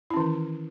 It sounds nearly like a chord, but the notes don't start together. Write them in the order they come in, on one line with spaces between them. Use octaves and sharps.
E4 C#4 E3 D#3